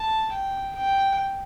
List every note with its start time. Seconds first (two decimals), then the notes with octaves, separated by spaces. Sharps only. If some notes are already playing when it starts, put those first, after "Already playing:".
Already playing: A5
0.32 G5
0.75 G5